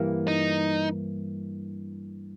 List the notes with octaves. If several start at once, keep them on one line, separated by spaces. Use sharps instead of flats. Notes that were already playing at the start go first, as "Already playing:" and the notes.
Already playing: G2 E3 A#3
D#4